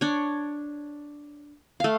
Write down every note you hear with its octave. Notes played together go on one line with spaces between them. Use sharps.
D4 C#5
A3 F5